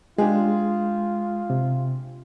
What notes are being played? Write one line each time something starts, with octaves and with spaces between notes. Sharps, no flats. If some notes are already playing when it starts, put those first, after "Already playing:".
G#3 D4 F4 G4 G#4
C3